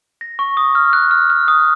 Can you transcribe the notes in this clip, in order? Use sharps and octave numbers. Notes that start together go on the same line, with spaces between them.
A#6
C#6
D#6
F6
F#6
F6
F6
D#6